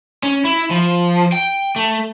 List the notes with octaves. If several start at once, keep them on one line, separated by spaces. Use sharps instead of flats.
C#4
E4
F3
G5
A3